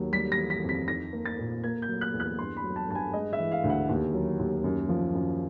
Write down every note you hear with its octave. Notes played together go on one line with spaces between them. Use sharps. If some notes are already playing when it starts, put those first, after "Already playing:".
Already playing: D#2 F#3
G3 B6
A#6
E3
B6
F2
B6
D#4 A#6
A#3
A6
A#2
A#3 G#6
G6
F#3
F#6
E2
F#6
G2 C6
B5
F#3
A5
G2 A5
G#5
G#3 D#5
E5
E3
F5
D2
F#5
D#2
F#3
D#2
F#2
F3
F#2